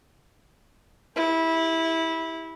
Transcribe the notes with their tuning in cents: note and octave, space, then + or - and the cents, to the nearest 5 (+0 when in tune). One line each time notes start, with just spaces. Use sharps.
E4 -15 G4 +15